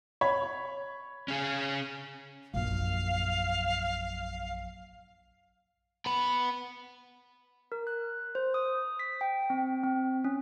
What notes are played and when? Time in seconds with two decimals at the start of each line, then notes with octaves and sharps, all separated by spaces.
0.21 C#5 B5
1.28 C#4 G#4
2.54 A#1 F#2 F5
6.06 B3 B5
7.72 A#4
7.87 F#6
8.35 C5
8.54 D#6
8.99 B6
9.21 G5
9.50 C4
9.84 C4
10.24 C#4